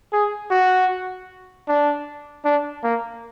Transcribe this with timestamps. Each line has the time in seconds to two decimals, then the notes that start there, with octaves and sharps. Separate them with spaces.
0.13 G#4
0.51 F#4
1.68 D4
2.45 D4
2.84 A#3